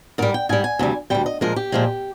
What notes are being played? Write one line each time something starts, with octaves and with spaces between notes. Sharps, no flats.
G#2 G3 A#4
G5
G#2 G3 G#5
G#5
D2 C3 G3
D2 C3 G3 G5
D#5
A#2 F3 G#3 A#4
G4
A#2 F3 G#3